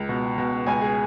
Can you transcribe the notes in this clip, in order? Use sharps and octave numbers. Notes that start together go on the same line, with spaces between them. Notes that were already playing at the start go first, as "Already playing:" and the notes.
Already playing: C#2
B2
B2
C#2 G#5
G#4